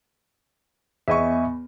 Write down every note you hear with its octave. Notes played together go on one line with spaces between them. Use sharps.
E2 B3 D#5 E5 G#5 C#6